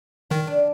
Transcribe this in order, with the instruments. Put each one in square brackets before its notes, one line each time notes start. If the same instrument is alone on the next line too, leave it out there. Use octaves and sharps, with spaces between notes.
[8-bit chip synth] D#3 [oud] D#4
[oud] D4